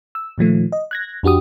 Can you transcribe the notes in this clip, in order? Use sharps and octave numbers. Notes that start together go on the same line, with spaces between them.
E6
A#2 D#3 F3 A3
D#5
F#6 G#6 A#6
F2 D4 F#4 G4 D#6